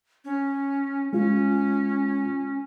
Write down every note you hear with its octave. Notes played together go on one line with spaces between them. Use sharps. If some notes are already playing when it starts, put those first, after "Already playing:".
C#4
G#3 C#4 F4